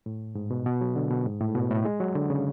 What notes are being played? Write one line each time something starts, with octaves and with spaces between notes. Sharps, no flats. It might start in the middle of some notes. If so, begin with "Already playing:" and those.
A2
G#2
B2
B2
F#3
D3
B2
G#2
A2
B2
A2
G#3
F#3
D3
C#3